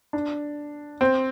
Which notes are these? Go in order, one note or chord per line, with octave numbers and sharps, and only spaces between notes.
D4
C4